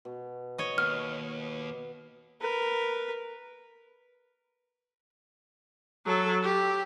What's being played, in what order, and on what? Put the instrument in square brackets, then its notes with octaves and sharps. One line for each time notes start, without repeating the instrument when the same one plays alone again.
[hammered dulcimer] B2
[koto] C#5 D#5
[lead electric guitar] D#2 [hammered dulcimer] B3 [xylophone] F6
[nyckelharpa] A#4 B4
[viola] F#3 A4
G4